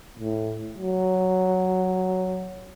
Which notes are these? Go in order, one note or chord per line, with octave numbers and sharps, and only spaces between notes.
A2
F#3